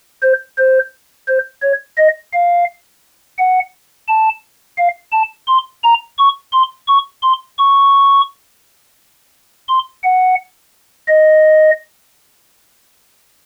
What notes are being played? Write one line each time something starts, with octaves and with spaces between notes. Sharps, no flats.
C5
C5
C5
C#5
D#5
F5
F#5
A5
F5
A5
C6
A#5
C#6
C6
C#6
C6
C#6
C6
F#5
D#5